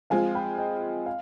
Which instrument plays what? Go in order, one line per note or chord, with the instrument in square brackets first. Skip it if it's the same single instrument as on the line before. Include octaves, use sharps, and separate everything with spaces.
[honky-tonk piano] F3 G#3 C4 F4 [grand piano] F5 G#5
[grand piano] G5 B5
D#5 G5
F5